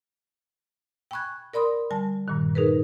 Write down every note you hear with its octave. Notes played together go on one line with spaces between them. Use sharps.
G5 G#5 B5 C#6 F#6 G#6
A#4 D5 B5 C6 D#6
D3 G3 G#5 A5
G2 A#2 D#3
D#4 G#4 A#4 B4